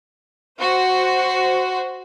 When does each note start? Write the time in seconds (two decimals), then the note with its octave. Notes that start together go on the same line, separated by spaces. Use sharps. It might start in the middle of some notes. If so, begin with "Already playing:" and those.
0.59 F#4 C5